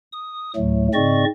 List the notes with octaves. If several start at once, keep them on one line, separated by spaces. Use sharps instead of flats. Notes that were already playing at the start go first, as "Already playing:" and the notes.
D#6
D2 A2 F#3 A3
G#2 C#3 C4 D5 D#5 C#6